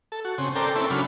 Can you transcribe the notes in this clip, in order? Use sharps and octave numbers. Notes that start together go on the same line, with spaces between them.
A4
F#4
C#3 C4
A4 A#4 C5 D5 G5
C4 C#4 E4 A4
C#3 F#3 D4 B5 F6